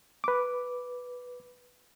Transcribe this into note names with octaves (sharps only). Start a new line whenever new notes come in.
B4 D6